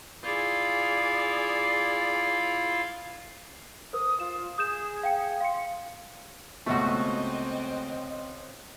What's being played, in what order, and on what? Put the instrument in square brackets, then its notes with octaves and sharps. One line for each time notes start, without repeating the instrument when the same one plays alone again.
[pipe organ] E4 F4 F5 [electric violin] G#4 D5
[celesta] A#4 C5 [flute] D#6
[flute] F4 [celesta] E7
[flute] G#4 [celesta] D#6 G6 E7
[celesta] F5 G5 C#7
[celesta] F5 C#7 [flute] C6
[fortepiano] C#2 B2 [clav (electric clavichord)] A3 F#4 [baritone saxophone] C4 [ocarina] D#5